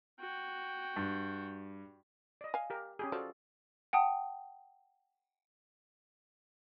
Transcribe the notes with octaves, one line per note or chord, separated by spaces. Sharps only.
F#4 G5
G2
D5 D#5
F5 G#5
G4 A#4
C#4 G4 G#4
F3 F#4 A4 D5
F#5 G5 A5 D#6